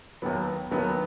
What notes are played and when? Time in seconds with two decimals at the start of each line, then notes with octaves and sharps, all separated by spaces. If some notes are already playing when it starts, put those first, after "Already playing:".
0.22 D#2 D#3 F#3 B3
0.71 D#2 D#3 F#3 B3